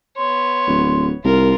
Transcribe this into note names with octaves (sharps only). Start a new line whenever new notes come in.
B3 C#5 C6
D1
C2 F4 A#4